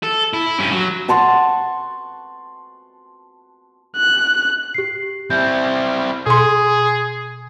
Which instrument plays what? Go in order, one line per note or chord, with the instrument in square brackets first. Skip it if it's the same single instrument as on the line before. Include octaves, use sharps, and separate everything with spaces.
[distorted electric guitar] A4
E4
G2 C#4
F#3
[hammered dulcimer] F#5 A5 C6 C#6
[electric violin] F#6
[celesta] G4 C7
[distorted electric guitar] C4 E4 [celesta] G6
[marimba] B2 C6 [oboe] G#4